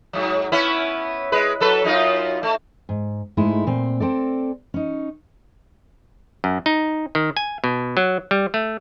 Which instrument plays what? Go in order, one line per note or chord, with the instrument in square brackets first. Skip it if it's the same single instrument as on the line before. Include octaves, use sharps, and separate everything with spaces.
[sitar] G#2 F#3
B3 C#4 E4
G#3 B4
F#3 A4 B4
F#2 D#4 F4
A3
[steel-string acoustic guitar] G#2
G#2 G#3 A3 D#4 E4
A#2 C4
C4 A4 D5
C#4 D#4
[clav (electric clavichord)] F#2
D#4
D#3
G#5
B2
F#3
G3
A3